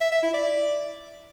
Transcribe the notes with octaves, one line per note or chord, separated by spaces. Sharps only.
E5
E5
E4
D5